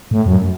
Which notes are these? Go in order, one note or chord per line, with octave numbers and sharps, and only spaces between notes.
A2
F#2